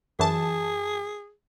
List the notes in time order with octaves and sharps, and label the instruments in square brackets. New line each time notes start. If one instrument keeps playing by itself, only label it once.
[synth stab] F#2 E3 A5 [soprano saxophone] G#4